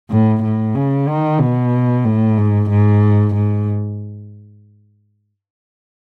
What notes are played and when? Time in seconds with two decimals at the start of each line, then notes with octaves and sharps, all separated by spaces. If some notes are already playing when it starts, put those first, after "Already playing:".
0.10 A2
0.43 A2
0.75 C#3
1.08 D#3
1.40 B2
2.05 A2
2.37 G#2
2.70 G#2
3.34 G#2